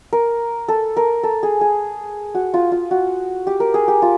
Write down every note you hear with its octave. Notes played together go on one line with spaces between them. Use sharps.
A#4
A4
A#4
A4
G#4
G#4
F#4
F4
F4
F#4
G4
A#4
G#4
G4
F4